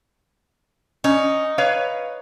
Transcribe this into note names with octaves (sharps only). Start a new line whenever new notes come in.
C#4 D#4
B4 C#5 F5